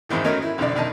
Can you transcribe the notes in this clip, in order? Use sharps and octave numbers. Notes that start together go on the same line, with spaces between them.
A1 F2 G#2 D#3 E3
D#3 A3 C#4 D#4 F#4 A#4
E4
B1 F2 D3 D5
B1 D#3 D#5 A5